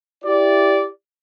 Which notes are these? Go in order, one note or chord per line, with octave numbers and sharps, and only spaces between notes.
E4 G4 D5